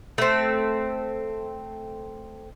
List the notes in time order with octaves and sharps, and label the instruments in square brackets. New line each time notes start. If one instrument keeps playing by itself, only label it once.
[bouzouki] A3 C4